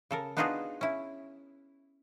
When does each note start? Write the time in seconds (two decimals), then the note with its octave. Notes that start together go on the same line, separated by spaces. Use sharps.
0.11 C#3 A4 A#4
0.37 B3 D4 D#4 F4 F#4 G#4
0.81 C#4 E4